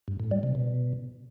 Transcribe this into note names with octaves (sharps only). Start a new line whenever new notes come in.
G2
A2
G3
C3
B2